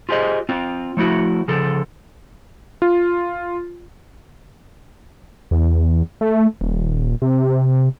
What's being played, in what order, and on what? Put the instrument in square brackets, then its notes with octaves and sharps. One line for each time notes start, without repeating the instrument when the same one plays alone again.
[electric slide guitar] F4 G4 G#4 C5 D#5
C4 F4
F3 A3 E4 F#4
C#3 F3 A4
[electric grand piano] F4
[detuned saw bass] E2
A3
D#1
C3